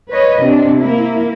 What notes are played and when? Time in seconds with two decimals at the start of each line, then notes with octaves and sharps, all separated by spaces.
0.10 B4 C#5 D#5
0.42 C3 D4
0.79 A#3 E4